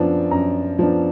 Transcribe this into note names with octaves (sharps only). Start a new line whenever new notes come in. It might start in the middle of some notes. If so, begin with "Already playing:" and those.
Already playing: F#2 F3 B3 D4
F#2 A#5
F3 B3 D4